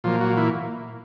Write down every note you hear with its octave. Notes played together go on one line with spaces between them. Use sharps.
A#2 F3 F#3 A#3 F4
F#3 F#4
E3 E4